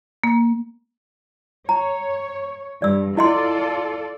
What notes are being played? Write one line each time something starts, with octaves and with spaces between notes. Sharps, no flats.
A#3
C#5 A#5
G2 D5 E6
E4 F4 A4 D5 D#5 C6